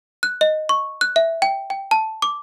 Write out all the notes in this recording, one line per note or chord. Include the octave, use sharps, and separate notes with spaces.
F#6
D#5
C#6
F#6
E5
G5
G5
A5
D6